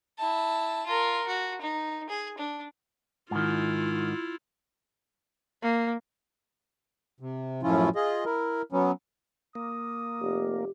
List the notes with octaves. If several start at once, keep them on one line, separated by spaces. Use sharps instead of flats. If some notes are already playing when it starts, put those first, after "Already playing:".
E4 A5
F4 A#4
F#4
D#4
G#4
D4
G#2 D#3 E4 F4
A#3
C3
F#2 A2 F3 C#4 E4 F4
F4 G#4 D#5
E4 A#4
F#3 B3 C#4
A#3 D#6
F1 G4